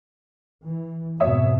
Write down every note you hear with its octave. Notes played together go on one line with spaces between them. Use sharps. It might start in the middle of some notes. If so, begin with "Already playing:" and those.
E3
F2 G#2 B2 C#5 E5 D#6